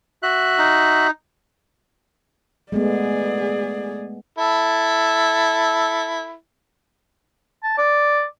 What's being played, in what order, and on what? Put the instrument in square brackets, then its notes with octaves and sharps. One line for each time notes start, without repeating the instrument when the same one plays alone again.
[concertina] F#4 E5 F#6
[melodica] D#4
[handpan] G#3 A3 B3 [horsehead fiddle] G#4 D5
[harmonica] E4 A4
[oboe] A5
D5